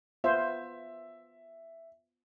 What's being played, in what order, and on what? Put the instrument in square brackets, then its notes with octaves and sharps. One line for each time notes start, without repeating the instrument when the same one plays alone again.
[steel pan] B3 F4 C5 [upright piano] E5